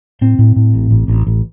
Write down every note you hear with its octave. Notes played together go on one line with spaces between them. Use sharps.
A2 C4
A2
A2
A1
A1
A1
A1